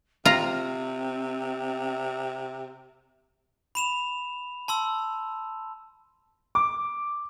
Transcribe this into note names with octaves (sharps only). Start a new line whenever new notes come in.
C3 C4 F4 A#5
B5 E7 F7
A5 C6 E6
D6